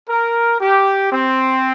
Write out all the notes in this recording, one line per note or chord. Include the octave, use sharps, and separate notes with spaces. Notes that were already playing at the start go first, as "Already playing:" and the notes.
A#4
G4
C4